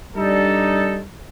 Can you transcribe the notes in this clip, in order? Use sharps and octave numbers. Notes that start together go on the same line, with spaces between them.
G3 D4 D#4 A4